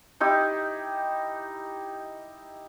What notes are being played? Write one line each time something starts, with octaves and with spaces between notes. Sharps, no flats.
D#4 E4 G4 D6